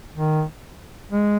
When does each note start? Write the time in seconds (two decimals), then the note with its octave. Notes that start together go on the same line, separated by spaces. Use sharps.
0.14 D#3
1.12 G#3